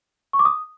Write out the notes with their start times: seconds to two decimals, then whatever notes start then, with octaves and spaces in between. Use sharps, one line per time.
0.33 C#6
0.39 D6
0.45 D#6